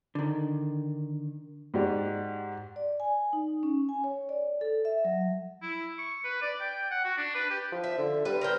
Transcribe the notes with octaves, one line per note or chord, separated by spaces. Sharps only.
D3 D#3
G#2 F#4 G4 D5
D5
G#5
D#4
C#4
G#5
C#5
D5
A4
E5
F#3
E4
C#6
B4
D5
G5
F#5
F#4
D4
B4
G4
F3
E5
D3
G3 B4
A#4 C5 G5